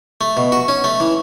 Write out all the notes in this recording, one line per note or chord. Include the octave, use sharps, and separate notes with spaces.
A3
B2
F#4
C#4
A3
E3